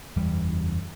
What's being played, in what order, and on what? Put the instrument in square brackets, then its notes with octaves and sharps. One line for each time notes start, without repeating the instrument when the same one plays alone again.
[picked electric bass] F#1 E2 E3 G3